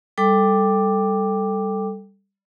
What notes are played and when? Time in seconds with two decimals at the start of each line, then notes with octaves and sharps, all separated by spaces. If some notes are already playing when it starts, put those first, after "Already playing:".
0.18 G3 A4 G5 D6